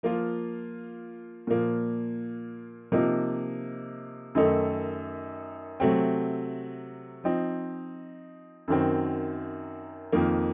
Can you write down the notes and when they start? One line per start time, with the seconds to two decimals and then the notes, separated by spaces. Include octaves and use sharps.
0.03 F3 A#3 F4
1.47 A#2 F3 A#3
2.92 C3 F3 A#3 D#4
4.35 F#2 D#3 A3 D#4 A4
5.80 C3 F#3 A3 C4
7.24 F3 C4 D#4
8.68 F#2 D#3 F#3 C4
10.12 F2 D#3 A#3